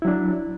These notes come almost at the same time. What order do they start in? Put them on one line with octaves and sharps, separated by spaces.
E4 F#3 D4